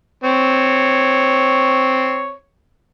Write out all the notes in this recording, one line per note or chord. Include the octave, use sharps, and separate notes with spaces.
C4 C#5